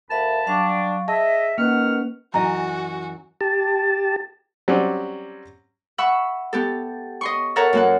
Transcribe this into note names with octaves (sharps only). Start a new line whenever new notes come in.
D2 A#4 E5 F5 A5 B5
F#3 G3 D4 F5 C#6
G#4 D#5 E5 A5
D#3 A#3 C#4 B4 F#5 F6
F#2 E3 F#3 F#4 D#5 A#5
G4 A5
F#3 G3 C4 C#4 D5
E5 F#5 B5 C#6 E6
B3 G4 A4
D#5 C6 C#6
A4 A#4 C#5 E5 F#5 A#5
F#2 A#3 F#5